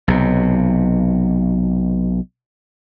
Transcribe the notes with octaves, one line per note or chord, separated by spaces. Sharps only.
B1 C3